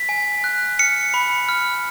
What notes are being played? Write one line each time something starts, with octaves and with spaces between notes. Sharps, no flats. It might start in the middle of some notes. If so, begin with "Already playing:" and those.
Already playing: B6
G#5
F#6
F6 C#7
B5
F6